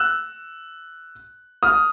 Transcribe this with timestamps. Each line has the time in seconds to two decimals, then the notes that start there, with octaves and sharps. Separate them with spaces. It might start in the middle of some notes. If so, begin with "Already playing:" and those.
Already playing: E6 F#6
1.63 D#6 F6